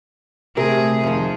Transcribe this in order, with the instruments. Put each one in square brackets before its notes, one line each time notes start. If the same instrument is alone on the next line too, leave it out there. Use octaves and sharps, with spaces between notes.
[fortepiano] C3 [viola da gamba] A3 G#4 [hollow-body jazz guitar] A#4
[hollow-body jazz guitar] F2 D#3 [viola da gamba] F3